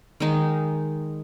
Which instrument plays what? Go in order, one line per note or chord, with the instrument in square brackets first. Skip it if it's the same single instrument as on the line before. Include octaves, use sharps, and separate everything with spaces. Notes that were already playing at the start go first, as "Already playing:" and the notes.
[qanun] D#3 G#3 D#4